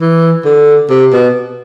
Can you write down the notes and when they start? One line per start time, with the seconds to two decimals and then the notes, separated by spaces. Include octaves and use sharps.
0.01 E3
0.45 D3
0.90 C3
1.13 B2